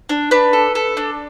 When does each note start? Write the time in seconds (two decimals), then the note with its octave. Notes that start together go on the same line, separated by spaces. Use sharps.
0.09 D4
0.31 D4 B4
0.53 A4
0.75 A4
0.97 D4